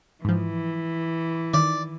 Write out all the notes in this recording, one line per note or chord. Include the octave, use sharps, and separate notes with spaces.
G#2 E3 F3
D#3 D5